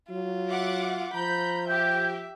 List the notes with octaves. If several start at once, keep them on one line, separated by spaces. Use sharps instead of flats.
F#3 F4
E5 F#5 D6
F3 A#5 B5 G6
G4 E5 G5 G6